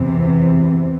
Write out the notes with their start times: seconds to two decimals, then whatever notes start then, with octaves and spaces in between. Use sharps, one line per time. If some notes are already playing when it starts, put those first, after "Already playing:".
Already playing: E2 C3 E3